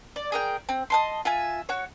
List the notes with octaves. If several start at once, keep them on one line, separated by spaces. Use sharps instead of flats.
D5
G#4 A#4 G5
C4
D#5 A5 C6
F4 E5 G#5
F#4 C#5